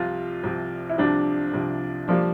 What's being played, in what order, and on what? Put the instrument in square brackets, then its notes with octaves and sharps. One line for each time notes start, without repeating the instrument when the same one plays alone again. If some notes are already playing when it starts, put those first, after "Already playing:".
Already playing: [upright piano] C2 C3 F3 [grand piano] F4
[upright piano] C2 C3 F3
[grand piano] E4
[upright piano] C2 C3 F3 [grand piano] D4
[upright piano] C2 C3 F3
[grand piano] F3 [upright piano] G3 A#3 D4